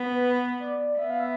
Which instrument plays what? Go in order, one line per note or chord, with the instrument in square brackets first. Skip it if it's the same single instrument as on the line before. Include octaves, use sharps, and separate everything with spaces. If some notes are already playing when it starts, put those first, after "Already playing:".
Already playing: [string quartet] B3
[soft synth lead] B4
D5
D5
[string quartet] B3 [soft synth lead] E5
[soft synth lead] F5
E5